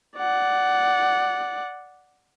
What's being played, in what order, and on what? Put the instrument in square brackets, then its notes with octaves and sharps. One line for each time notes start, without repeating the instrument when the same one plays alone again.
[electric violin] D5 F#5